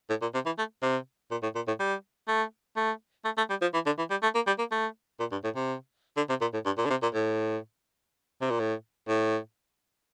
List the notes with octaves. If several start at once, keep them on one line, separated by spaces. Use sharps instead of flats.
A2
A#2
C3
E3
A3
C3
A#2
A2
A#2
A2
G3
A3
A3
A3
A3
G3
F3
E3
D3
E3
G3
A3
A#3
G3
A#3
A3
A#2
G2
A2
C3
D3
C3
A#2
A2
G2
A#2
D3
C3
A#2
A2
C3
A#2
A2
A2